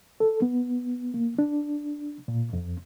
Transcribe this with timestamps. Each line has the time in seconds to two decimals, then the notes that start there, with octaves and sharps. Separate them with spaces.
0.20 A4
0.42 B3
1.14 A#3
1.39 D4
2.28 A#2
2.53 F2